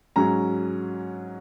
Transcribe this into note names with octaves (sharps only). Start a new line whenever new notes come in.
G#2 F#3 C#4 A#5